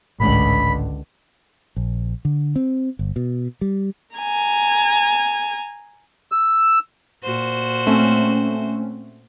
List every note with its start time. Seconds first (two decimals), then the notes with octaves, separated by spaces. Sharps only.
0.20 G#1 C#2 A2 D3 G#3 B5
1.76 A#1
2.25 D3
2.56 C4
2.99 G1
3.16 B2
3.61 G3
4.15 G#5 A#5
6.32 E6
7.23 A#2 F#4 C5
7.87 A3 C4 C#4